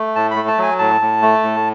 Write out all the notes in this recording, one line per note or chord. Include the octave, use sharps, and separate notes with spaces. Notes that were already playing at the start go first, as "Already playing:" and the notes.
Already playing: A3
A2 A5
B5
A3
A5
F#3 G#5
A2 A5
A2
A3
A2